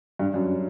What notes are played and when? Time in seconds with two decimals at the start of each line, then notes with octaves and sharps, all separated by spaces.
0.19 G2
0.34 F#2